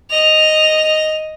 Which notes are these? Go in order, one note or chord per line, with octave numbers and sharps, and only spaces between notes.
D#5 F7